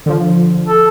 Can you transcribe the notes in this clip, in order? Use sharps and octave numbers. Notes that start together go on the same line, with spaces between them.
D3 F3
A4